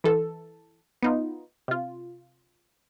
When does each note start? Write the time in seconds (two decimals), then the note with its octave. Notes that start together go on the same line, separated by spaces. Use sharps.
0.04 E3 A4
1.03 B3 D#4 F4
1.68 C3 F4